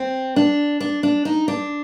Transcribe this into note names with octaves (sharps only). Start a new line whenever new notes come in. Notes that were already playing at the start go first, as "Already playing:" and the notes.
Already playing: C4
D4
D4
D4
D#4
D4